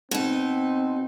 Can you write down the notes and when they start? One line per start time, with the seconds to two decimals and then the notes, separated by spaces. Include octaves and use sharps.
0.11 B2 C4 D#4